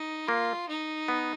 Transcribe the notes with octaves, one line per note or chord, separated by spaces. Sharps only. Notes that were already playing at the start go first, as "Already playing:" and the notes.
Already playing: D#4
A#3 F4
D#4
B3